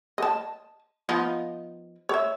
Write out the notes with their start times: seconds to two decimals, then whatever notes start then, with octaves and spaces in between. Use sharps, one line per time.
0.18 D#5 A5
1.09 F3 B3 D#4
2.09 C#5 E5